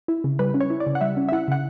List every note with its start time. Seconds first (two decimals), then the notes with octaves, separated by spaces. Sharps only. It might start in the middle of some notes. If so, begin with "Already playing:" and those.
0.08 E4
0.24 C#3
0.39 G3 B4
0.54 C#4
0.61 C#5
0.70 E4
0.80 D5
0.87 C#3
0.95 F#5
1.01 G3 E5
1.17 C#4
1.29 E5
1.32 E4 F#5
1.48 C#3 F#5